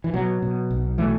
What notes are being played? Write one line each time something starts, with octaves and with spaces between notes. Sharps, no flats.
E3
B2 F#3
B2
B1
B2 E3 A3